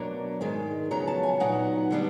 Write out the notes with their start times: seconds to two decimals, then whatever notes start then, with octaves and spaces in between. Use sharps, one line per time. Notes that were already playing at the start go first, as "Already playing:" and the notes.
Already playing: B2 F#3 A#3 D4
0.41 G#2 D#3 G#3
0.91 F2 C#3 F#3 B3 A#5
1.07 A5
1.23 G#5
1.40 A#2 F#3 B3 D#4 F#5
1.91 D3 G3 B3 D4